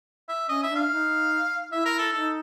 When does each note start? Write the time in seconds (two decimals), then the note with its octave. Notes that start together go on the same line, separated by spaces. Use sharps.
0.29 E5
0.49 C#4 D#5
0.63 E5
0.70 D4
0.76 F5
0.90 D#4
1.72 E4 E5
1.85 A#4
1.99 A4
2.12 D#4 A4